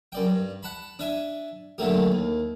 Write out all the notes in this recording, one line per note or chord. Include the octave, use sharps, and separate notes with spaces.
F#2 D5 G5
G2
F#5 A5 B5
D4 E5 G#5
A#2 D3 F#3 A3 G4
D#2